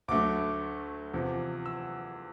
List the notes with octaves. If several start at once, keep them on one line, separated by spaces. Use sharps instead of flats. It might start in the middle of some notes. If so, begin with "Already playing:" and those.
D2 D3 F#3 A3 D6
E2 C3 F3
E6